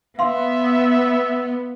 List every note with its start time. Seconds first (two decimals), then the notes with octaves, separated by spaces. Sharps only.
0.19 B3 E5 F5 C6